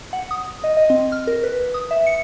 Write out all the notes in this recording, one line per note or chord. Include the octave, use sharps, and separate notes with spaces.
F#5
D#6
D#5
D#5
C4
F6
A#4
B4
D#6
E5
C#7